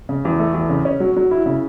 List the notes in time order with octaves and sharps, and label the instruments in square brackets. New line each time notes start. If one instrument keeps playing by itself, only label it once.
[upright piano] C#3
E2
A3
E2
C#3
C#4
F#3
F#3
E4
C#3